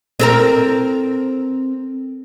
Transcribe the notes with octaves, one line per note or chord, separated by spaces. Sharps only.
C4 A4 A#4